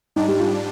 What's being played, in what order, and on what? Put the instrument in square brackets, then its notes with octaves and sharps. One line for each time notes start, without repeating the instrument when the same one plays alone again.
[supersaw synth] G#2 G3 D4 [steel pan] D#4
[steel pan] G4
F4